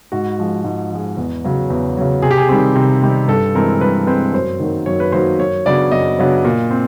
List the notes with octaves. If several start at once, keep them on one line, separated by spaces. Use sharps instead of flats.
G#2 F#4
F3 G#3
G#2
F3 G#3
E2
C#3 F#3
E2
C#3 F#3
C3 G#4
G4
G#4
D#3 G3 C4
C3
D#3 G3 C4
G2 A4
E3 G#3 C4 A#4
G2 B4
E3 G#3 C4 B4
F#2 C5
D#3 F#3 A#3
F#2 C#5
B4
D#3 F#3 A#3 C5
F#2 C#5
C#3 F#3 B3 D4 D5
F#2 D#5
C#3 F#3 B3 D4
A#2
C4